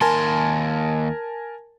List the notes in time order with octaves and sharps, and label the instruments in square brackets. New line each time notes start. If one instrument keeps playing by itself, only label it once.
[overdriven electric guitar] D#2 C6 [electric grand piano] A#4 G#5 A5